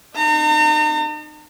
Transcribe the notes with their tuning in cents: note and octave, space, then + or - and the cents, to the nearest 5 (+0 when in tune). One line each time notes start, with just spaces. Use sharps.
D#4 -35 A#5 -45